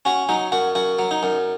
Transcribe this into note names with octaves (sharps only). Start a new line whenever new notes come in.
C#4 F#4
F#3 D#4
F#2 F#4
F#2 F#4
F#3
D#4
F#2